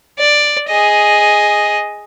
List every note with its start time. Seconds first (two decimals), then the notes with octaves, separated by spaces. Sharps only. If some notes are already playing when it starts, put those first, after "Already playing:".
0.19 D5
0.69 G#4 D#5